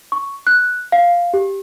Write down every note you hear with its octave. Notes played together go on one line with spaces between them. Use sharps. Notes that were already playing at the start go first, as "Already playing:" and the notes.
C#6
F#6
F5
G4